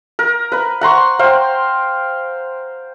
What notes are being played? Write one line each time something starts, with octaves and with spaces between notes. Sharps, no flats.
A#4
B4 B5
F#5 A#5 C6 C#6
C5 F5 G5